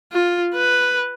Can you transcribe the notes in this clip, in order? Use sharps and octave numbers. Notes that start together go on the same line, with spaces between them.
F4
B4